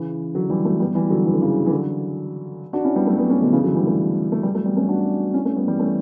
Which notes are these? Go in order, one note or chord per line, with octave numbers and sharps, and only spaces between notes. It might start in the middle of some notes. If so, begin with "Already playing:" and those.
Already playing: C#3 E3
D3 F#3
E3 G3
F#3 A3
G3 B3
E3 G3
D3 F#3
E3
D3
C#3 E3
E3
D3 F#3
D4 F#4
C#4 E4
G3 B3
F#3 A3
G3 B3
A3 C#4
B2 D3
C#3 E3
D3 F#3
E3 G3
F#3 A3
A3
E3 G3
F#3 A3
G3 B3
A3 C#4
D4 F#4
C#4 E4
A3 C#4
G3 B3
E3 G3
A3 C#4